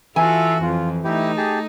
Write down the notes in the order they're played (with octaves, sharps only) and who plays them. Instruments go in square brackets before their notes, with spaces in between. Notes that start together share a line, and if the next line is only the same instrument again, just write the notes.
[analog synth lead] E3 [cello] F4 F#4 [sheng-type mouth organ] A4 E5 [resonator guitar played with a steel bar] G#5
[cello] F2 [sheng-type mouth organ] F4
[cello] A3 D#4 [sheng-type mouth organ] E4 G4
[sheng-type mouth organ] G4 G#4 A5